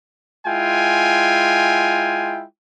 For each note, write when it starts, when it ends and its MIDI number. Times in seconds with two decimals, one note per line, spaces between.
0.46 2.43 56
0.46 2.43 64
0.46 2.43 65
0.46 2.43 79
0.46 2.43 80